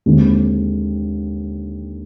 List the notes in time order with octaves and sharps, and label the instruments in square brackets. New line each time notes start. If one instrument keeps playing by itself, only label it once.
[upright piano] D#2 D3 G#3 C4